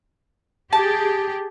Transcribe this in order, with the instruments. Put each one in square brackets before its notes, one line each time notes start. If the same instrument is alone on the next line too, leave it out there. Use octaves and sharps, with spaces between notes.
[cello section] G4 G#4 [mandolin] A5